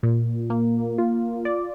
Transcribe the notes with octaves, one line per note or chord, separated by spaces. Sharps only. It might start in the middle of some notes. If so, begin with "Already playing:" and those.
A#2
A#3
F4
D5